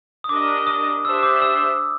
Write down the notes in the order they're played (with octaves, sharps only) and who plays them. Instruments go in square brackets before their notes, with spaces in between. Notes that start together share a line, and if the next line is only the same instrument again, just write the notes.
[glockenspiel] D#6
[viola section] D4 G4 A#4 D#5 [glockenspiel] D6
[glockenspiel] D#6
[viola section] D4 G4 C5 E5 [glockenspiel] E6
[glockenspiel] D6
E6